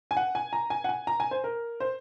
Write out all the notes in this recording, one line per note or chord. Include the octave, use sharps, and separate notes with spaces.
G#5
F#5
G#5
A#5
G#5
F#5
G#5
A#5
G#5
C5
A#4
C5